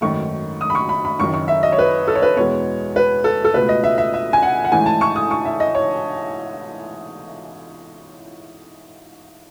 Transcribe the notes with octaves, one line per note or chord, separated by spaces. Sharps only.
G#1 F#2 D#3 A3 C#6
D#6
B5
C#6
B5
B5
F#1 F#2 D#3 C#6
C#6
E5
D#5
C#5
B4
A4
C#5
B4
E2 B2 G#3 B3 C#5
B4
A4
A4
C#2 B2 A3 B4
D#5
E5
E5
E5
G#5
F#5
F#5
A1 G#2 E3 A3 G#5
A5
C#6
D#6
C#6
E5
D#5
C#5